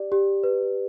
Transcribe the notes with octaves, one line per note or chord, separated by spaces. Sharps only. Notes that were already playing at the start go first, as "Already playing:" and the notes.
Already playing: G4 D5
G4
B4